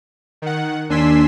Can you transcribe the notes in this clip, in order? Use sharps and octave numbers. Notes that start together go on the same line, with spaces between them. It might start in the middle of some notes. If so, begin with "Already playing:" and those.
D#3 F#5
D#2 D4 G#5 C6 E6 B6